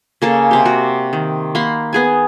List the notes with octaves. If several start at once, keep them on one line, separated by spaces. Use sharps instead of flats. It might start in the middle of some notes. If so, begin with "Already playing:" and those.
C#3 A#3 A4
C3 G4
F#4
D#3
A#3 F#5 B5 C6
B3 G#4 G#5